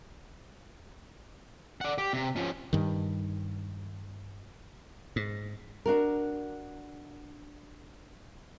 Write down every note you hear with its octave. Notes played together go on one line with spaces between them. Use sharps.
D5 F#5
G4
C3
F3 C#4
G2 D#3
G#2
D4 F#4 A#4